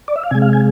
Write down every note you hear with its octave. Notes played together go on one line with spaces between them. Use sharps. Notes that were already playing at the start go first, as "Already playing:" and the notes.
D5
E5
F5
C3 G#3 G#5
F5
G#5